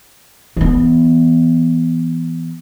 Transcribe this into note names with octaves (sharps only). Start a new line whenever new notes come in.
E3 B3